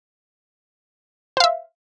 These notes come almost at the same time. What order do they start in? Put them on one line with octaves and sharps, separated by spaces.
C5 F5 E5